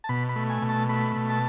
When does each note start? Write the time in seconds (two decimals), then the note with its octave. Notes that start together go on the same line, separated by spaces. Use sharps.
0.04 A5
0.09 B2 B5
0.29 B5
0.36 A3
0.50 G#5
0.62 B2
0.69 A5
0.89 A3 B5
1.16 B2
1.30 A5